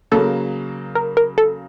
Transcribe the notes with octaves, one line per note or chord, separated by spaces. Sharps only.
C#3 F#3 A#3 A4
A#4
A#4
A4